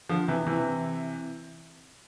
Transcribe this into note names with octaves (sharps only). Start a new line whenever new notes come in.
D3 F3
C3 E3
C3 E3